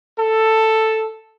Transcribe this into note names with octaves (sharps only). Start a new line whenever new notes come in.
A4